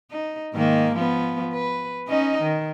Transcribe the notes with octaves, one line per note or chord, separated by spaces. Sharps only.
D#4
G#2 D#3 A#3
F3 B3
B4
C#4 D#4 D#5
D#3